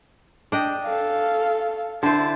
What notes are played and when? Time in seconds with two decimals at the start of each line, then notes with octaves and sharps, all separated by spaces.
0.52 D4 D#5 G5
0.84 A4 F5
2.03 D3 E4 C5 A5